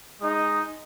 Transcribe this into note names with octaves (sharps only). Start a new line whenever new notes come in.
G#3 D#4 D#6